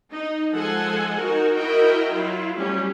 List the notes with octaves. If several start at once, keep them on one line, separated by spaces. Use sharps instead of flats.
D#4
F3 G#3 A4 F#5 G#5
D#4 F#4 A#4
E4 F#4 A#4 D#5 G5
F#3 E4 F4
F#3 G3 A3 C#4 G4